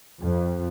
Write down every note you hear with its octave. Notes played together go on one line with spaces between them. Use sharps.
F2